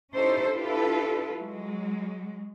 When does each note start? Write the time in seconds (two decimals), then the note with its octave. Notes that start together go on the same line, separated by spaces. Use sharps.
0.13 C#4 D#4 E4 G4 A4 C5
0.52 D4 E4 F4 G4 A4 B4
1.36 F#3 G#3